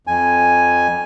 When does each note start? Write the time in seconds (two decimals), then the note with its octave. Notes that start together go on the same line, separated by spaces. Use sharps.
0.07 F2 G#5